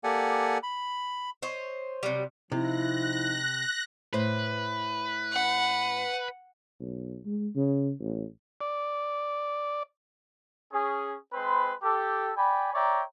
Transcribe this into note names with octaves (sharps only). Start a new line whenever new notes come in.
A#3 G4 A4 D5 F#5 G#5
B5
C5 C#5 D#5
C3 F#3 G3
C3 F3 D#4 E4 F#6 A#6
A2 B4 C5
F#5
B1
G#3
C#3
A1
D5 D6
C#4 G#4
G#3 C4 B4 C5 B5 C6
G4 A4
D5 G5 G#5 B5
C#5 D5 E5 G5 A#5